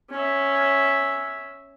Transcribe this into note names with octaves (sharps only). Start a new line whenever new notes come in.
C#4 E5